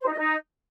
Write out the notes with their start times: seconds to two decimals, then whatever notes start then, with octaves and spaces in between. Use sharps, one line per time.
0.01 C5
0.06 D#4
0.11 D#5
0.17 D#4